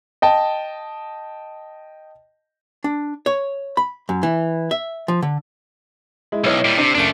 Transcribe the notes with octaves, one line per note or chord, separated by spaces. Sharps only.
D#5 G5 A5
D4
C#5
B5
F#2
E3
E5
F3
D3
G#3 E4
B1 E4 C#5 D#5
A#2 G3
C3 D4 D5
F#1 A3 D4 D7